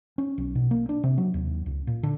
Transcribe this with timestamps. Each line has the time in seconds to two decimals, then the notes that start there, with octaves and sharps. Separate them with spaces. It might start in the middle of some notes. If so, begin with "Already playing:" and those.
0.18 C#4
0.38 B1
0.55 B2
0.71 A#3
0.89 D4
1.04 C3
1.18 F#3
1.34 D#2
1.66 C#2
1.87 A#2
2.03 D3